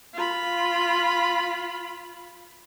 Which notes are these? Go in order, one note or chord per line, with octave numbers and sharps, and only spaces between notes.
F4 B5